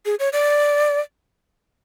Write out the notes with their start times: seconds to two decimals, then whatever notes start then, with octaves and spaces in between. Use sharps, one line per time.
0.06 G#4
0.19 C#5
0.33 D5